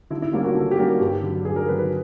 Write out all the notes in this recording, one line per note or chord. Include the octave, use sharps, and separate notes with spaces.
D3 E4
E4
G3 A#3 C#4 F4
F#4
D3 A4
G4
G3 A#3 C#4 F#4
G2 G4
D3 F#3
G2 G#4
A#4
D3 F#3 B4
B4